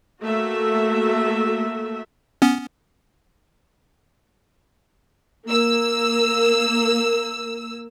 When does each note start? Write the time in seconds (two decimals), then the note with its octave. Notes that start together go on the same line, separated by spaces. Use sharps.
0.23 A3 A#3 F#4 A4 E5
2.42 B3 C#4
5.47 A#3 E6